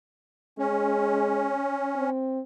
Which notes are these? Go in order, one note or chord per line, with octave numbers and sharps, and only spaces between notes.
G#3 C#4
C4